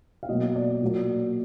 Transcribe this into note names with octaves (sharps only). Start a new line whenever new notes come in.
F5
B2 F#3 A#3 D#5
D5
A#2 F#3 A#3